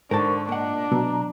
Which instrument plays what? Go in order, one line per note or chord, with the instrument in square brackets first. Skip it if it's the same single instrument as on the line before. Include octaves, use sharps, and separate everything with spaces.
[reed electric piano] G#2 [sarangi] D3 [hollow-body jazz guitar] A#4 C5 A5 [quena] C#6
[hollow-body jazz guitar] A#2 F#5 [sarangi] D4 [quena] D#5
[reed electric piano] B2 [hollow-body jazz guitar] F#3 [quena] A#5